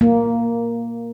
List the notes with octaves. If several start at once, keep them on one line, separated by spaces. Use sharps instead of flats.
A#3